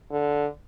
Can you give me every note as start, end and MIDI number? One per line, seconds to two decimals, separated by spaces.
0.11 0.47 50